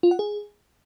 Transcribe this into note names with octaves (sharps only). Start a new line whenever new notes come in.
F4
F#5
G#4